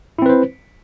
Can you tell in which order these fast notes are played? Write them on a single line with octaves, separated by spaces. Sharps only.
E4 C4 B4 C5